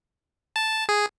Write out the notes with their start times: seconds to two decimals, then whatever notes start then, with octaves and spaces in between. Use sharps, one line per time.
0.56 A5
0.89 G#4